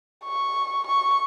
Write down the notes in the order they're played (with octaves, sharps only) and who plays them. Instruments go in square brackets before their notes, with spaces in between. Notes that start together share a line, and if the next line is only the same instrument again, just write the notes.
[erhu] C#6
C#6